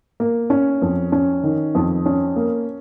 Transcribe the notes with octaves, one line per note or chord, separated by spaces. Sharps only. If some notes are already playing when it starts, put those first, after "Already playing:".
A#3
C#4
F2
C#4
D#3
F2
C#4
A#3